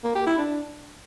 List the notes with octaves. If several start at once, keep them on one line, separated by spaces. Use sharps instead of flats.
A#3
G4
E4
D4